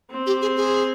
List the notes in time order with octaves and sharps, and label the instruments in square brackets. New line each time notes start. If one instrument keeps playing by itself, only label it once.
[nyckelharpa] C4
[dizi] G4
G#4
G#4